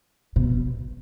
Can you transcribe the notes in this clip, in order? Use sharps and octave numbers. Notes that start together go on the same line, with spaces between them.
B2